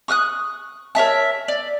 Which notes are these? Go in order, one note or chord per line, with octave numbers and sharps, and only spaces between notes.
C#6 D#6 F6 F#6
A#4 C#5 E5 A5
D5